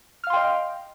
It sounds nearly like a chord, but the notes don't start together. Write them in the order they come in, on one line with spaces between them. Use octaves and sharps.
F6 F5 C6 G5 D#5